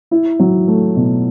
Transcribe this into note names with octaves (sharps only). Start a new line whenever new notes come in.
E4
F#3
A3
B2